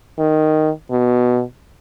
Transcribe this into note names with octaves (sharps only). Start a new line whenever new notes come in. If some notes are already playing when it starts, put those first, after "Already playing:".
D#3
B2